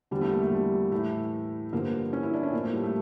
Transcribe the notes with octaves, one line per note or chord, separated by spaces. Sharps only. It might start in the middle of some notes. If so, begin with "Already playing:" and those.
E2 D3 F3 G3
A3
A#3
A3
G3
A2 E3 A3
G2 D3 F3 A#3
C#4
E4
D4
C#4
A2 F3 A#3
A3
G3
A3